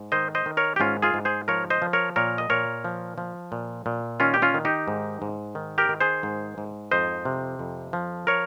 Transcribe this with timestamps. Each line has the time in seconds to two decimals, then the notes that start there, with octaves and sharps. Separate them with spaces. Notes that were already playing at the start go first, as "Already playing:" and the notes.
Already playing: G#2
0.12 D#3 C5 D#5
0.35 C5 D#5
0.46 D#3
0.57 A#4 C#5
0.76 G4
0.80 G#2 C#4 F4
1.02 F4 G#4
1.14 G#2
1.25 G#4 C5
1.48 F3 A#4 C#5
1.70 C5 D#5
1.82 F3
1.93 A#4 C#5
2.16 A#2 A#4 C#5
2.38 D#5
2.50 A#2 A#4 C#5
2.84 F3
3.18 F3
3.52 A#2
3.86 A#2
4.20 D#3 C#4 F4
4.34 G4
4.42 C#4 F4
4.54 D#3
4.65 D#4 G4
4.88 G#2
5.22 G#2
5.55 D#3
5.78 G4 A#4
5.89 D#3
6.00 G#4 C5
6.23 G#2
6.58 G#2
6.91 F2 C5 D#5
7.25 C3
7.59 F2
7.93 F3
8.27 A#4 C#5